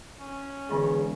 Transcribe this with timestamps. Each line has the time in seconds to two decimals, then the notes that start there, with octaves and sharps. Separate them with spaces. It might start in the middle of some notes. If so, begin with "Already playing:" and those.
0.20 C#4
0.70 E1 D3 E3 B3 G#4